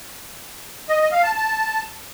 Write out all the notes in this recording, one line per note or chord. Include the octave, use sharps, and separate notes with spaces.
D#5
D#5
F5
A5
A5